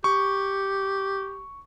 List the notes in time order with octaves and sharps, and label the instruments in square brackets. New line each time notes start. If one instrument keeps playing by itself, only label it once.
[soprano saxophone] G4 [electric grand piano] C#6